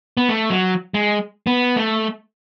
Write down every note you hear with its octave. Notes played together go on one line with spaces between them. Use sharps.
B3
A3
F#3
G#3
B3
A3